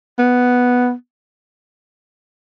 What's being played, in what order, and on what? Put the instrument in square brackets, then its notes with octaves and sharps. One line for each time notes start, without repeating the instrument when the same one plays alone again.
[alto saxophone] B3